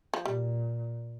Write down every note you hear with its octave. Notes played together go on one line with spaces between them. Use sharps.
F3
A#2 G3